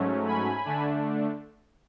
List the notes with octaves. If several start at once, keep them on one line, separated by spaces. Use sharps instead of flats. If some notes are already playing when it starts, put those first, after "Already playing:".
Already playing: G#2 F#3 A3 C#4
G#5 B5
D3 A3 D4